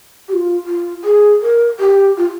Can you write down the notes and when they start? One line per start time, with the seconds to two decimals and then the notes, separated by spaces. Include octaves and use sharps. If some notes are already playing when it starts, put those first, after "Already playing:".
0.28 G4
0.33 F4
0.66 F4
1.04 G#4
1.42 A#4
1.80 G4
2.17 F4